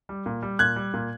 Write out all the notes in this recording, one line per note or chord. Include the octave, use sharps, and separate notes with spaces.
G3
A#2
G3
A#2 F#6 G#6
G3
A#2